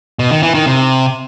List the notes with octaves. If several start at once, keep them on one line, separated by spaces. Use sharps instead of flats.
B2
D#3
E3
D#3
C3